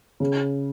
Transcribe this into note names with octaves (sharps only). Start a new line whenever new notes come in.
C#3